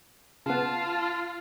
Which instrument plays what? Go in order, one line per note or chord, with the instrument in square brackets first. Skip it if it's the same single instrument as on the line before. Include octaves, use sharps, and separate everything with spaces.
[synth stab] C#3 B3 [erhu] F4 [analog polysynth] A5